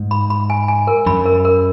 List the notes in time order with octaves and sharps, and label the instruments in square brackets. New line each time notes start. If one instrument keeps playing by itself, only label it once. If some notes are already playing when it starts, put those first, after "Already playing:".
Already playing: [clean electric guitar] G#2
[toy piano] B5
B5
G#5
G#5
A#4
[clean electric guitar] F#2 [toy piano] B5
[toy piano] A#4
A#4